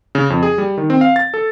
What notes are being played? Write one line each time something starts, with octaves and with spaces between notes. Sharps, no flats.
C#3
F2
G#4
G3
D#3
C4
F5
A6
A4